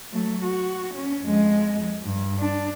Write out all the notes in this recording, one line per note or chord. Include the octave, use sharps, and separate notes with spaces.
F#3 A3
F#4
C#4
F2 G#3
G2
D4